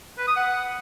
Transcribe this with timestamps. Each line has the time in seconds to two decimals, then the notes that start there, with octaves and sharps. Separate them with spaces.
0.18 B4
0.27 D#6
0.36 F#5